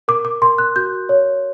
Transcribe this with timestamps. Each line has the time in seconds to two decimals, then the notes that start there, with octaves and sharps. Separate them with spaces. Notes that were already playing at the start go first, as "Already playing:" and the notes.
0.08 A#4 D6
0.25 D6
0.42 A#4 C6
0.58 F#6
0.76 F#4 G6
1.09 C#5